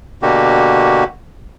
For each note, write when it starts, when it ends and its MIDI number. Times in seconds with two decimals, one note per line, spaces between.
0.22 1.04 47
0.22 1.04 50
0.22 1.04 58
0.22 1.04 66
0.22 1.04 67